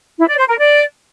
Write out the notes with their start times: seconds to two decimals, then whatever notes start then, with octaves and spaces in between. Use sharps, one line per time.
0.18 E4
0.28 D5
0.38 C5
0.48 A#4
0.58 D5